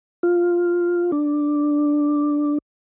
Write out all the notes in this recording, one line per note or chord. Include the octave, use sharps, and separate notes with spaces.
F4
D4